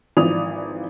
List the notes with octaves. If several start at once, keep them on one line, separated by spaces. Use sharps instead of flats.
G#1 E3 F3 D5 D#6 F7